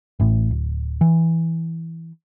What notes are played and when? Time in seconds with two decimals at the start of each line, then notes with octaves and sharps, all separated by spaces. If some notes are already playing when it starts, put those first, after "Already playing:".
0.20 A1 A2
0.51 D1
1.01 E3